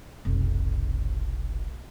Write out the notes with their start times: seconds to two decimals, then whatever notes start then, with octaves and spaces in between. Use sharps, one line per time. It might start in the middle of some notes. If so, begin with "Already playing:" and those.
0.25 F1 B1